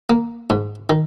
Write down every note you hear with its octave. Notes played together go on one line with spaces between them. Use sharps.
A#3
G#2
D#3